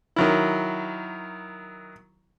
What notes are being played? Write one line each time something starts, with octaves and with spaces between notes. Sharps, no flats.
D#3 F#3 E4